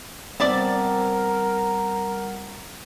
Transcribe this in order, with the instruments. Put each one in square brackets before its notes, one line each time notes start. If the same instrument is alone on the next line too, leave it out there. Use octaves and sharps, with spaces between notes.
[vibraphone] G3 F#5 [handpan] B3 C4 [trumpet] A#4 [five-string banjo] D5 E5 A5